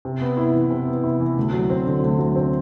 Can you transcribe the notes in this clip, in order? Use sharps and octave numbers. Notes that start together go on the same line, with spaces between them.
C3
B3
E4
E3
C3
B3
E4
E3
D2
F#3
C4
D3
D2
F#3
C4